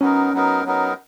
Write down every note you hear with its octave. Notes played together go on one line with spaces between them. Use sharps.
F#3 B3 C#4 D#4 A#4
F#3 B3 D#4 A#4
F#3 B3 D#4 A#4